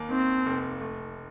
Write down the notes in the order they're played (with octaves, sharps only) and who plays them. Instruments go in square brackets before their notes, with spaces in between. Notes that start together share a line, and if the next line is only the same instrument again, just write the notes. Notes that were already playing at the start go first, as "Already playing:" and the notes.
Already playing: [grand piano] D#2 A#3
[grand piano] D#3 [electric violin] C4
[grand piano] F1
A3